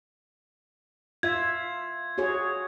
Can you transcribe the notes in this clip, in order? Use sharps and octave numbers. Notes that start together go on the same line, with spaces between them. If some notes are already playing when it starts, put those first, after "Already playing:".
F4 E5 G#6
F#4 G#4 C#5